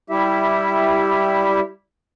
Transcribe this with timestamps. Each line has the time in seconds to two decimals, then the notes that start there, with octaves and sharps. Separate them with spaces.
0.10 G3 E4 G4 E5